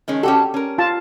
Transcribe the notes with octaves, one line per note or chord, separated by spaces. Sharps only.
D#3 G#3 C#4
C#4 F#4 G4 A4
C#4 A#4
F4 A5